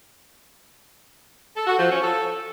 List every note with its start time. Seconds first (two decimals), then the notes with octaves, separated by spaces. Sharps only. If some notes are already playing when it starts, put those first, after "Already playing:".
1.56 A4
1.67 F#4
1.78 F3
1.90 C#4
2.01 A4